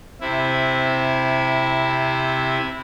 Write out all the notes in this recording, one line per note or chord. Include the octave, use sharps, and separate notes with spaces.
C3 E4